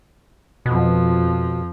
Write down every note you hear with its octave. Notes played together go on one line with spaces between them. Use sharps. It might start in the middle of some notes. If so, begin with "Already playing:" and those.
F2 B2 F3